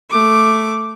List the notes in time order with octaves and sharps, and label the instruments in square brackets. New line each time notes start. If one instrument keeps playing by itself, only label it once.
[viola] A3 D6